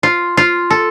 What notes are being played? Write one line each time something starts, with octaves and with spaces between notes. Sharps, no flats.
F4
F4
A4